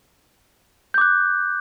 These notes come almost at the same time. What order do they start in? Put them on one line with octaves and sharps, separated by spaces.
G6 D6 F#6